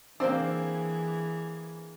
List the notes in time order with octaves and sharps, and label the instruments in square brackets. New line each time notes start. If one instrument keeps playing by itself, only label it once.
[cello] E3 G#4 [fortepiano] A#3 D4 [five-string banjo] C4 C5